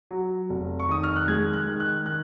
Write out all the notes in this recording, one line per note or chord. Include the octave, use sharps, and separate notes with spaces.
F#3
F1
C#6
D#3 D#6
F6
F#6
G#3 G#6
F#6
D#3
F#6
D#3 F#6